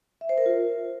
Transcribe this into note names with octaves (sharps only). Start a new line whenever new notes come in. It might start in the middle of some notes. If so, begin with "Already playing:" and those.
E5
C5
A#4
F4